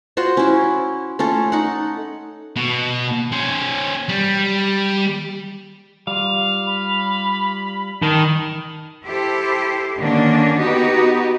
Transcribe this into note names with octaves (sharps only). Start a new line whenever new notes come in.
F4 F#4 C5 F#5
C#4 E4
A3 C#4 F4 A4
D#4 F#5
B2
C#4 C5
G3
G3 F4 F5
B5
D#3 A#4 A5
E4 G4 A4 C5
D3 D#3 A#3 C#4 D4
B3 D#4 F#4 G4